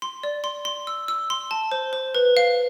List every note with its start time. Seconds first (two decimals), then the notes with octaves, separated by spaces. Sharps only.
0.02 C6
0.23 D5
0.44 C6
0.65 C6
0.87 E6
1.08 E6
1.30 C6
1.51 A5
1.72 C5
1.93 C5
2.15 B4
2.37 F5